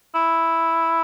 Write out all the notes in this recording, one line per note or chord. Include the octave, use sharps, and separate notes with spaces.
E4